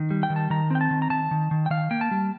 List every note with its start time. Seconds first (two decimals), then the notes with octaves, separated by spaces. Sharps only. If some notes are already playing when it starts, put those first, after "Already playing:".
Already playing: D#3
0.10 G3
0.23 G5
0.30 D#3
0.36 A5
0.50 D#3 A#5
0.71 C4 G5
0.81 A5
0.91 D#3
1.02 A#5
1.10 D#3 A5
1.31 D#3
1.51 D#3
1.66 G5
1.70 D#3 F5
1.91 A#3 G5
2.01 A5
2.11 G3